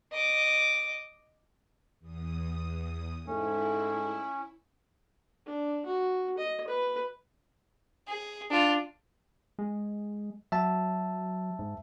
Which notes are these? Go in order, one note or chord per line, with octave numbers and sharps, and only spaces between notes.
D#5 D6
E2 D#6
G#2 G#3 A3 C#4 E4
D4
F#4
D#5
B4
G#4
D4 F4
G#3
F#3 E5 A5
G#2